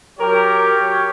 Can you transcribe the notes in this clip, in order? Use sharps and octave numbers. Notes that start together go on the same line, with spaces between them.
F#3 G4 A#4 C#5